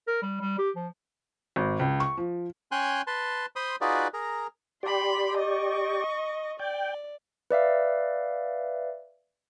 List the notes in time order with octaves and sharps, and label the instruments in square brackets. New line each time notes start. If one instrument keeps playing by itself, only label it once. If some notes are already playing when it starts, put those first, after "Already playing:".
[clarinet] A#4
G3
G3
G4
F3
[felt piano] G#1
C#2
C#6
F3
[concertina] C#4 C#5 G5 G#5 C6 F#6
B4 A5 C6
C5 B5 C6 D#6
D#4 F4 F#4 G#4 B4 D5
G#4 A#4 A#5
[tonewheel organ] G4 D5 [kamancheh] B5 C6
[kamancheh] D#5 C#6
[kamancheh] D5 [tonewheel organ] G5
[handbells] B4 D5 E5 F5